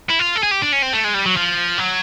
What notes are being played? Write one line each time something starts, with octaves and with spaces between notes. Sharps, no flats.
E4
F4
A4
G#4
G4
D4
C#4
C4
A3
G#3
G3
F#3
F3
F#3